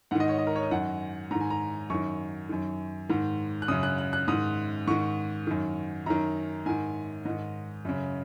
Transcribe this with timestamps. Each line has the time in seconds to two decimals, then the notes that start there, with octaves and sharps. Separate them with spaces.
0.11 G#2 D#3 F#5
0.20 D#5
0.29 C#5
0.38 D#5
0.47 A#4
0.56 C#5
0.63 D#5
0.71 F#2 D#3 F#5
1.31 G#2 D#3 A#5
1.40 G#5
1.50 A#5
1.90 F#2 D#3 C#6
2.49 F#2 D#3
3.09 G#2 D#3
3.62 F#6
3.68 F#2 C#3 D#6
3.83 F#6
3.98 F#6
4.13 F#6
4.28 G#2 D#3 D#6
4.87 G#2 D#3 C#6
5.47 F#2 D#3
6.06 F#2 D#3 A#5
6.66 G#2 D#3 G#5
7.25 G#2 D#3 D#5
7.85 F#2 C#3